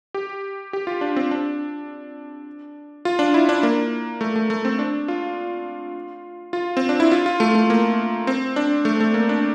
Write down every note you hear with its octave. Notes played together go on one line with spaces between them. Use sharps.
G4
G4
F4
D4
C4
D4
F4
D4
E4
D4
A#3
A3
A3
A3
C4
D4
F4
F4
C4
D4
E4
F4
F4
A3
A3
A#3
C4
D4
A3
A3
A#3
D4